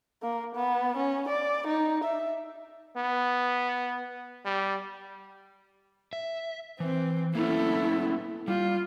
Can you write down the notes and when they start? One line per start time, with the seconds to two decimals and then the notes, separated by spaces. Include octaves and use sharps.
0.23 A#3
0.55 B3
0.97 C#4
1.29 D5
1.67 D#4
2.04 E5
2.97 B3
4.45 G3
6.13 E5
6.80 E3 C4
7.35 A#3 B3 C#4 E4 A4
8.48 G3 F4